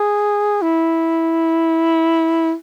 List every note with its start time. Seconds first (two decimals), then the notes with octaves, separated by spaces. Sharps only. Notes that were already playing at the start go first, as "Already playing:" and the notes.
Already playing: G#4
0.62 E4